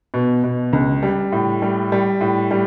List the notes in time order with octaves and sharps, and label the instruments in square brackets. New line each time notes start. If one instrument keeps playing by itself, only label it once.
[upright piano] B2
B2
C#2
G3
A2
G3
G3
A2
G3